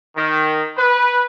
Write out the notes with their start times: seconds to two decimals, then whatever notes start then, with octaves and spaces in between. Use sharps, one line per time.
0.16 D#3
0.78 B4